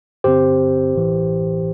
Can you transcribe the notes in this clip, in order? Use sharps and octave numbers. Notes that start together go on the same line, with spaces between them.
G2 D3 C4 G4 C5
A1 A2 E3